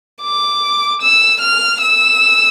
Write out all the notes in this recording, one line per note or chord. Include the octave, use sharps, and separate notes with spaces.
D6
E6
F6
E6